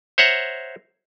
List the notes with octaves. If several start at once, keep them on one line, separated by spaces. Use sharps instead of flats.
C5 C#5 E5 F#5 A#5